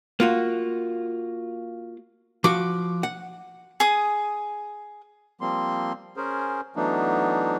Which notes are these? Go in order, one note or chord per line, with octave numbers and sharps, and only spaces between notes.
A#3 F4 F#4
F3 F#4 D6
F#5
G#4 D#6
F3 G3 A#3 C4 C6
C#4 G#4 A#4 C5
E3 F#3 A3 B3 D4 D#4